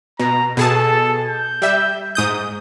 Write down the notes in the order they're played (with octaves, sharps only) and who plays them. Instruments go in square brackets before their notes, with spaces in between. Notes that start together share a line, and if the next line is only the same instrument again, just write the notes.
[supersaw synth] B2 [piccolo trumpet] A#5
[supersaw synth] B2 G#4 A5 [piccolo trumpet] A4
[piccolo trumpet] G6
[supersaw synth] G3 E5
G#2 D#6 G6